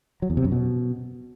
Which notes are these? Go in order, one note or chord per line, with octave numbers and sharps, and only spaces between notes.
F#3
E2
C3
F#2
B2